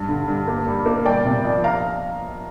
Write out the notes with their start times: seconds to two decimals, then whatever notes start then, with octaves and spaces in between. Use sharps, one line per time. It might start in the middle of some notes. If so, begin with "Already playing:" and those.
Already playing: G2
0.08 D3
0.28 G2
0.48 A#3
0.67 G3
0.86 A#3
1.05 G1 D5 G5
1.25 C3
1.44 F2
1.64 F5 A#5